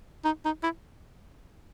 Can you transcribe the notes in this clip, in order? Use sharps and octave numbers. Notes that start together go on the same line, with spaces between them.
D#4
D#4
E4